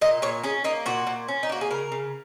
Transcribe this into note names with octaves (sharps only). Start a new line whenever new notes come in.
A#2 D#5
A#2 C#5
C#4 G#4
A#3 D#4
A#2 F#4
A#2
C#4
D#4
A#3 F#4
G#4
C#3 A#4
C#3